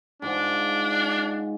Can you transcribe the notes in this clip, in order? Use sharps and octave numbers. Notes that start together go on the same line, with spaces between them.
G#2 D4 F4 F#5